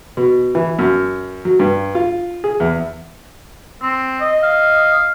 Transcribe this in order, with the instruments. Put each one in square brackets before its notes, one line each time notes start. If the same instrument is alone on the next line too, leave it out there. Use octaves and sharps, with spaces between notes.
[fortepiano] B2
E3
F#2
F#3
G2
F4
G#4
E2
[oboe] C4
[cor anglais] D#5
[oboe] F5